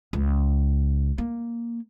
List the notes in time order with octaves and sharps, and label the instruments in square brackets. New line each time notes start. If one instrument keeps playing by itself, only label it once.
[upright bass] C#2
A#3